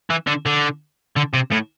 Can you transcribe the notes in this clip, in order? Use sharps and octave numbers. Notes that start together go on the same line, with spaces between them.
E3
D3
D3
D3
C3
A2